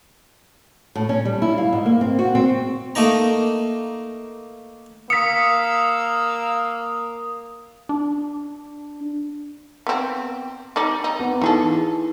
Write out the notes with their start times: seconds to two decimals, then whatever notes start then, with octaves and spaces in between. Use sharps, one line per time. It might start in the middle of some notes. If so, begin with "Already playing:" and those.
0.96 A2
1.09 C#4
1.25 G3
1.42 E4
1.58 F5
1.73 G#2
1.86 A#3
2.01 C4
2.19 F#4
2.35 C4
2.95 A3 A#3 D#4 A#5
5.10 A#3 F5 D#6 E6 B6 C#7
7.89 D4
9.87 B3 C4
10.76 G3 D#4 D5
11.04 D#4
11.20 B3
11.42 E3 D#4 G#4 A4